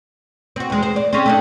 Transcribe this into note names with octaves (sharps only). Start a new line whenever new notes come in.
C4 F#4
E2 G#3
C5
D5
C4 C#4 G#4
A3 D4 D#4